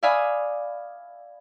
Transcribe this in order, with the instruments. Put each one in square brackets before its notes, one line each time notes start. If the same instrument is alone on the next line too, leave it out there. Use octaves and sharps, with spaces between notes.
[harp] D5 E5 F5 G#5 B5 D#6